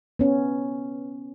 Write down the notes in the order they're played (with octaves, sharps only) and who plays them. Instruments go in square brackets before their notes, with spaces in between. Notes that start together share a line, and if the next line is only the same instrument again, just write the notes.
[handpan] B3 C#4